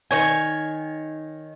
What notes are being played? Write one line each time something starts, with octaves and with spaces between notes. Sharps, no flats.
D#3 C#5 G#5